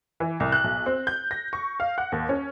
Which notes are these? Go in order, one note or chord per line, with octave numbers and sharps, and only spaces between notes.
E3
C2
F#6
B1
C4
G6
A#6
C#6
F5
F#5
D#2
C#4